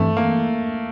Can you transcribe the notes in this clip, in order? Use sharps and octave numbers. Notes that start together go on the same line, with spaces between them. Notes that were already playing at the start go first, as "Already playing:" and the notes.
Already playing: G2 E3 A3 C4
A#3